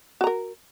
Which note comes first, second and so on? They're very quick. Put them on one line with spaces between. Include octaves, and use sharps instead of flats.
F#4 A#5 A#4